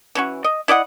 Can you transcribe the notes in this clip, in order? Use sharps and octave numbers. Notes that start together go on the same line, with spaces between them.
E3 C#4 F#4
D#5
E4 D5 D#5 F#5